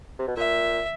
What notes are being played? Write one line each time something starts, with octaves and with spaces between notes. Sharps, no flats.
C3
B2
A#2 E5